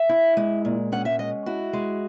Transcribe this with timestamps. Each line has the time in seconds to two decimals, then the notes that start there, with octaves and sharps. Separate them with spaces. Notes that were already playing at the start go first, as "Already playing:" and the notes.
Already playing: E5
0.09 E4
0.37 G#3
0.65 A#2
0.92 C#4 F#5
1.05 E5
1.19 G#3 D#5
1.46 E4 F#4
1.73 G#3